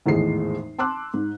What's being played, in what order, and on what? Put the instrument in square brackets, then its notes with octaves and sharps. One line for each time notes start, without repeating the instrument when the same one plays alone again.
[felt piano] G#1 E2 A2 G#3 C7
A5 C6 D6 E6 F#6
G#2